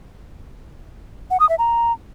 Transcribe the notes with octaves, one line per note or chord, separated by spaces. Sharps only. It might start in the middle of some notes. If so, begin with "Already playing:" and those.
F#5
D#6
E5
A#5